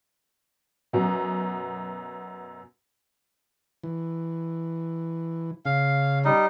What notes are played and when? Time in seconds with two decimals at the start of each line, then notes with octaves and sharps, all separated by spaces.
0.93 F#2 B2
3.84 E3
5.65 C#3 F5
6.25 G3 D#4